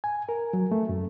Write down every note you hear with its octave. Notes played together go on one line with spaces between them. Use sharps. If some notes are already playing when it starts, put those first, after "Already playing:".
G#5
A#4
F#3
A3
F#2